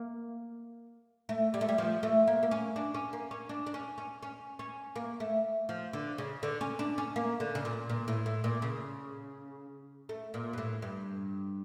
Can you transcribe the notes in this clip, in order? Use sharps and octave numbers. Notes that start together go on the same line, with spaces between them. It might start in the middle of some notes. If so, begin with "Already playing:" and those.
Already playing: A#3
A3
G3
A3
G3
F3
A3
A#3
A#3
C#4
D4
C#4
A#3
C#4
D4
D4
C#4
C#4
C#4
C#4
A#3
A3
F3
D3
C#3
D3
C#4
D4
C#4
A#3
D3
C#3
A#2
A#2
A2
A2
A#2
C#3
A3
A#2
G2
A2
G2